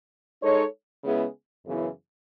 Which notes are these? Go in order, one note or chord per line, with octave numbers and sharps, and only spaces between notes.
G#3 D#4 A4 C#5
C#3 G#3 B3 E4 G#4
F#2 C#3 E3 B3 E4